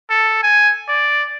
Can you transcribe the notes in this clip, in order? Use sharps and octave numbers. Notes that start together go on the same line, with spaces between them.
A4
G#5
D5